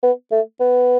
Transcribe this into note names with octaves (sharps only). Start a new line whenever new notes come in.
B3
A3
B3